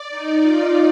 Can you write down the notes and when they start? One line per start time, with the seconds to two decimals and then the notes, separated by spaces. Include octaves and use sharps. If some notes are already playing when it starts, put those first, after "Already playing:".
Already playing: D5
0.10 D#4
0.41 F4